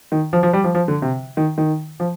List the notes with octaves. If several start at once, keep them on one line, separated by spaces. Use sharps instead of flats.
D#3
F3
F3
G3
F3
F3
D3
C3
D#3
D#3
F3